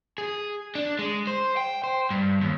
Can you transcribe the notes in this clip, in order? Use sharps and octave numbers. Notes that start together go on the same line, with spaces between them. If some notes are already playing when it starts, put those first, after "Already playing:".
G#4
D4
G#3
C5
G5
C5
G2
D#2